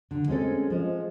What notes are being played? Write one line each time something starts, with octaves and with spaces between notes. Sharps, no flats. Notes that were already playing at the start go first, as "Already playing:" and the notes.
D3
G#3 C4 C#4 A4
F3 G#3